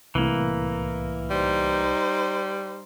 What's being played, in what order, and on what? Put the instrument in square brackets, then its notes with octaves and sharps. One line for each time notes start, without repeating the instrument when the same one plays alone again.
[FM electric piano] C2 A2 [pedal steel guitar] E3 A#3
[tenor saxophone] G3 [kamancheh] D#4 C5